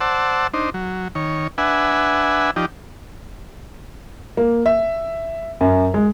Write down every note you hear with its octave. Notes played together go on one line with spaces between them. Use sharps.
C5 D5 F#5 A5 E6
D4 D#4 C5
F#3
D#3 C#5
D4 B4 E5 F#5 G#5
F3 D#4 G4 D5
A#3
E5
F#2
G#3